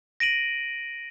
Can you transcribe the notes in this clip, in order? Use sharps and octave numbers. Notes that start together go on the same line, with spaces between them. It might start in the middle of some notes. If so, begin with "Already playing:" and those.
A#6 D7 D#7 F#7